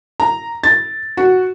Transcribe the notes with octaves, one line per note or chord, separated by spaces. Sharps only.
A#5
A6
F#4